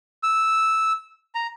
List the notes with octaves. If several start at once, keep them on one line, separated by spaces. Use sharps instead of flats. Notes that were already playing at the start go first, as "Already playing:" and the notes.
E6
A#5